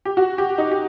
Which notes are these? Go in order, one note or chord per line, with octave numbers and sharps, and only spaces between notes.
G4
F#4
G4
D#4
G4